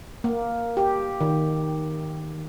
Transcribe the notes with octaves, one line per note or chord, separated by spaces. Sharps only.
A#3
G4
D#3